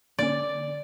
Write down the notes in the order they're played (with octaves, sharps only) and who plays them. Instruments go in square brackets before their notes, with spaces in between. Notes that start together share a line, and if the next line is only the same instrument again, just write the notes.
[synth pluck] D3 A#3 C#4 [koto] D5